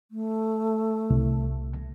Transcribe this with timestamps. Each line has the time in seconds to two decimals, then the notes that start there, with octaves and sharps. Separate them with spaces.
0.11 A3
1.10 C2